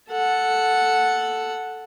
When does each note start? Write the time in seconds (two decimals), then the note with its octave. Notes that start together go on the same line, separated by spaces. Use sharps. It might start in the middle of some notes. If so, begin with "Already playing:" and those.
0.10 A4 F#5